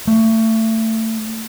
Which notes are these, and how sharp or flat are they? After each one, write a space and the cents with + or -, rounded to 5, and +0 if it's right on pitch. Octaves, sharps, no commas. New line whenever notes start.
A3 +25